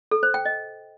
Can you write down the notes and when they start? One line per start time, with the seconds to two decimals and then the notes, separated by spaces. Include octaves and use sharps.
0.11 A4
0.23 C5
0.34 G5
0.45 D#5